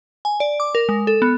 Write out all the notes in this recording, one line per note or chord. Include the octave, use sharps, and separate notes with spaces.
G#5
D5
D6
A#4
G#3
A4
B3